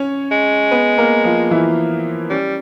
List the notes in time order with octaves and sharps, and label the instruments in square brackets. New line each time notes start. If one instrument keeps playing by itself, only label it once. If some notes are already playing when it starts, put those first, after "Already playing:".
Already playing: [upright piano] C#4 C#5
[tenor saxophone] G#3
[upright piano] B3 B4
A#3 A#4
F3 F4
E3 E4
[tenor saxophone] G3 [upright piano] C#4